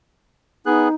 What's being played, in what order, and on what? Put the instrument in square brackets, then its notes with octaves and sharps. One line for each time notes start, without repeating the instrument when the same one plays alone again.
[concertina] B3 G#4 F#6 [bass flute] D#4